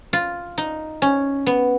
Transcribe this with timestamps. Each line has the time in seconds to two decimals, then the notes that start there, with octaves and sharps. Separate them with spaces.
0.13 F4
0.58 D#4
1.02 C#4
1.46 B3